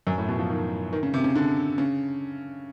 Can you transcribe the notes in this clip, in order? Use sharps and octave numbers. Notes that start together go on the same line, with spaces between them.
F#2
A2
B2
F3
D#3
D#3
C#3
C3
C#3
D3
C#3